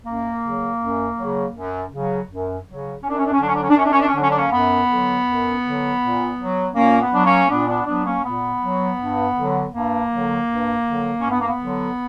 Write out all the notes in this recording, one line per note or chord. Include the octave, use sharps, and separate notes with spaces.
F#2 A#3
C#3 F#3
F#2
C#3 F#3
F#2
C#3 F#3
F#2
C#3 F#3
F#2 C#4
D4
C#4
D4
C#4
D3 F#3 C#4 D4
D4
C#4
D4
F#2 C#4
D4
C#4
D4
C#4
D3 F#3 C#4 D4
D4
A#3 C#4
F#2 B3
D3 F#3
F#2
D3 F#3
A#2
F#3
A#2 A#3 C#4
B3
F#3 D4
A#3 C#4
A#2 B3 D4
B3 D4
F#3 B3 D4
A#3 C#4
A#2 B3
F#3
G2
D3 F#3
G2 A#3
D3 F#3
G2
D3 F#3
G2 C#4
B3
A#3
B3
D3 F#3